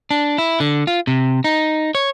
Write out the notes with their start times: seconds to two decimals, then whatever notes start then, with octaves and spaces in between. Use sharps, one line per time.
0.11 D4
0.38 E4
0.60 D3
0.87 F4
1.07 C3
1.44 D#4
1.95 C#5